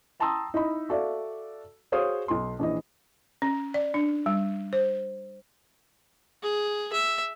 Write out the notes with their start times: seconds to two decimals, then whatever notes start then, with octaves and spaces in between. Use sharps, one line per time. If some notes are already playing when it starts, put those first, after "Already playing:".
0.20 G5 A5 A#5 C6 D#6 E6
0.54 D#4 E4 D#5 B5
0.89 F#4 A4 D5 E5 F5
1.92 F#4 G#4 C5 C#5 F5 D#6
2.28 B1 C6
2.59 A#1 E3 D#5
3.42 C#4
3.74 D5
3.94 D4
4.26 G3
4.73 C5
6.43 G#4
6.93 E5